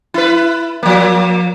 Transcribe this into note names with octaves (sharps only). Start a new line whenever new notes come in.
E4 B4
F3 A#3